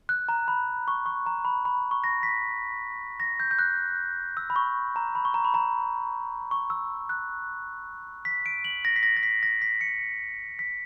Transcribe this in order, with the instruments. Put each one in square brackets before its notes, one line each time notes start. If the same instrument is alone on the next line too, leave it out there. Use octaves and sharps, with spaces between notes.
[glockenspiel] F#6
A#5
B5
C#6
C#6
A#5
B5
B5
C#6
A#6
B6
A#6
G6
G6
F#6
E6
B5
C#6
A#5
B5
C#6
A#5
B5
A#5
C#6
E6
F#6
B6
D7
F#7
A#6
B6
A#6
A#6
B6
A#6
B6
C#7
B6